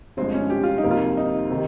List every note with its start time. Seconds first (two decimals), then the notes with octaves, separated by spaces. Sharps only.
0.17 G1 G2 F3 G#3 C4
0.34 C#4
0.50 G4
0.63 F4
0.78 D#4
0.84 F2 C3 F3 A#3
0.91 F4
1.17 D#4
1.50 C3 D#3